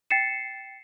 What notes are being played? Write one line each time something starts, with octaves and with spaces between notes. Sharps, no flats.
G5 A6 C7 C#7 E7